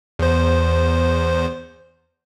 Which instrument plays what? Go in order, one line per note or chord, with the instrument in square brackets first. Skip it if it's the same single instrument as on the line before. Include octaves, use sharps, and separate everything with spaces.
[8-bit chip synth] E2 C5